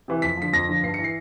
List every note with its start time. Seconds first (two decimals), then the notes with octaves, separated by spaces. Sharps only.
0.08 C3 E3
0.22 F2 B6
0.37 D3 F3 B6
0.53 F2 A#6
0.68 D3 F3
0.83 G2 C7
0.94 E3 C#7
1.04 C7